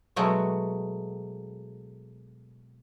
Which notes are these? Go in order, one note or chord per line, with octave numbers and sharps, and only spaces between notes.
B2 F#3 G#3 A3 F#4